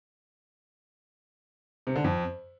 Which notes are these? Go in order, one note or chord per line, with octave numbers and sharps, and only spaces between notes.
C3
D3
F2